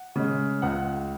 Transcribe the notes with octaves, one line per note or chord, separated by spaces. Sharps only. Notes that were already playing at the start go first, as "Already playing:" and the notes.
Already playing: F#5
C#3 G#3
C#2 F#5